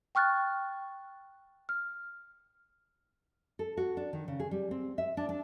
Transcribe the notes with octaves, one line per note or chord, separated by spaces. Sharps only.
G5 C#6 F6 F#6 A6
F6
A4
F#4
D4
D#3
C#3
G#4
G3
C4
E5
D4
D4